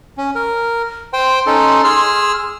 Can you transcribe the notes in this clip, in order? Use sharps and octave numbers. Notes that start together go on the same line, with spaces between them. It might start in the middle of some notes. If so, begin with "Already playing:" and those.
C#4
A#4
C5 G5 C6
C#4 D#4 A4
G#4 E6 F6